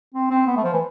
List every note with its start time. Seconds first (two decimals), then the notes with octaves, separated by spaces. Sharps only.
0.14 C4
0.30 C4
0.47 B3
0.56 A3
0.64 F3
0.73 E3